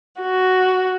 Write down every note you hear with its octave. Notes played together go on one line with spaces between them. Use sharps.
F#4